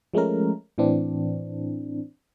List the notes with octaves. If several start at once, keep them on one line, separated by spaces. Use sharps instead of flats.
F3 G#3 A3 C#4 A#4
A2 E3 C4 D4